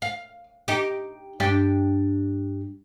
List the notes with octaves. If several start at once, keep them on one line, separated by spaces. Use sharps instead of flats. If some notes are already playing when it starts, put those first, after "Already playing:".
F5
D#4 G4
G2 D4 G4